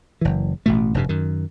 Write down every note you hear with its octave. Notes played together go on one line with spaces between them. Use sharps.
F#1 E3
A1 B2 A3
F1 G2 C3
F#2 D#3